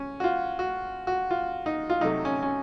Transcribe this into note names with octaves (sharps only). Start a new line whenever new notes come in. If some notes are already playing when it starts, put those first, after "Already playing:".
Already playing: C#4
F#4
F4
F#4
F#4
F4
D#4
F4
C3 F#3 A3 D#4
C#4
C#4